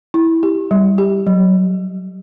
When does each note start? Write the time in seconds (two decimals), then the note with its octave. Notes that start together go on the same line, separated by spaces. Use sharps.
0.14 E4
0.43 G4
0.71 G3
0.98 G4
1.27 F#3